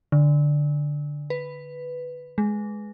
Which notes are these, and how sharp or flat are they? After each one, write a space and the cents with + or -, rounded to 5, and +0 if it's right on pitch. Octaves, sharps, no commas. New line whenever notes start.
D3 +0
B4 +5
G#3 +10